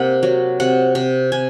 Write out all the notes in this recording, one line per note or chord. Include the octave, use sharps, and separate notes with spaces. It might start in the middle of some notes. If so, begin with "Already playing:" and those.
Already playing: C3 A#3 F#5
F#3
C3 F#5
C3
C3 G#5